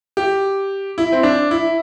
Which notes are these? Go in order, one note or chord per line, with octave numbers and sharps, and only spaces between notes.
G4
E4
C4
D4
E4